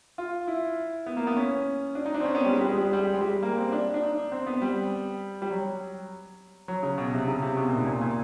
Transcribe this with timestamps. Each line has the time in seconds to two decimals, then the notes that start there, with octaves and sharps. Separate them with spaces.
0.18 F4
0.48 E4
1.06 B3
1.17 A#3
1.27 B3
1.37 C#4
1.95 D4
2.06 D#4
2.14 D4
2.20 C4
2.25 C#4
2.35 B3
2.45 G3
2.53 G#3
2.61 G3
2.69 G#3
2.77 G3
2.85 G#3
2.93 G3
3.13 G#3
3.21 G3
3.28 G#3
3.43 A#3
3.58 C4
3.72 D4
3.94 D4
4.02 D#4
4.32 C4
4.47 B3
4.62 G3
5.42 G3
5.50 F#3
6.68 F#3
6.82 C#3
6.98 B2
7.13 C3
7.27 C#3
7.42 C3
7.57 B2
7.67 A#2
7.77 G#2
7.87 A#2
8.01 A#2